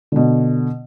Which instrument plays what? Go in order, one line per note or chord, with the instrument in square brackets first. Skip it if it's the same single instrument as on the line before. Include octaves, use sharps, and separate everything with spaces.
[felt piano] B2 D3